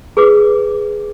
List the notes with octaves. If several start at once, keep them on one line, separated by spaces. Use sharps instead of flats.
G#4 B4 D6